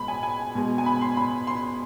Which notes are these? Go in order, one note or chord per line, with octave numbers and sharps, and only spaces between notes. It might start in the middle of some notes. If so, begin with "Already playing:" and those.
Already playing: B2 G#3 B5
G#5
G#5
B2 G#3
G#5
B5
C6
B5
C6